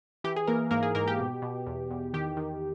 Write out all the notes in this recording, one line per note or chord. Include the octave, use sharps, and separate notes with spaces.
E3 G4
G#4
E3 A#3 A#4
G#2 A#3 A#4
G#4
G#2 A#3 A#4
G4
B2
B2
E2
E2
D#3 G4
D#3